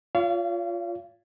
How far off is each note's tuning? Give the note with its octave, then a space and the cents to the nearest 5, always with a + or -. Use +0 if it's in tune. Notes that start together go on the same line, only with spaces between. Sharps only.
F4 +0 C#5 +40 F5 -35